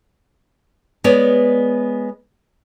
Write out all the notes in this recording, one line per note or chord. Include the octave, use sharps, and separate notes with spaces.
G#3 B3 C#5 D5